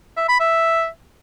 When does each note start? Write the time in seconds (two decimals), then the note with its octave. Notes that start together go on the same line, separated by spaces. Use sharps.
0.17 E5
0.29 B5
0.40 E5